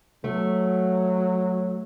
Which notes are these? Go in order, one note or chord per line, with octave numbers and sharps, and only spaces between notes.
F#3 A3